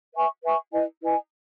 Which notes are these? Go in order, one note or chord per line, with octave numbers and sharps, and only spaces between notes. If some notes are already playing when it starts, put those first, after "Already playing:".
B4 E5 G#5 C#6
B4 E5 G#5 C#6
E4 B4 D#5 G#5
E4 B4 D#5 G#5